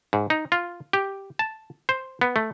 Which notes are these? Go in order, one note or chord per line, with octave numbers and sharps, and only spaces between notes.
G#2
D#4
F4
G4
A5
C5
B3
A3